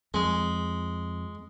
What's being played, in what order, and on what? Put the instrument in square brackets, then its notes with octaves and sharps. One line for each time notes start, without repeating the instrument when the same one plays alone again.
[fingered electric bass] F2 [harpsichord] G#3